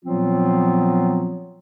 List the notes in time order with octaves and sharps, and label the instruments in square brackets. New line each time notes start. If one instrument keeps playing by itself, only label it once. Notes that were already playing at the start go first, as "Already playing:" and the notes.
[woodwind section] A#2 F3 F#3 B3 C4 F4